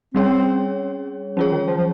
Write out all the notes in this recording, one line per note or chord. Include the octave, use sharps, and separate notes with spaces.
G3 C4 C#4 G#4 C#5
F3 C#4 F4 G#4 C#5
D#3
F3
F3